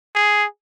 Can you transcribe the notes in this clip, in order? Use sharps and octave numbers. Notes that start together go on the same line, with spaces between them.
G#4